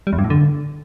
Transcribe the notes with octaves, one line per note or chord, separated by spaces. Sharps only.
G3
E2
G2
A2
D3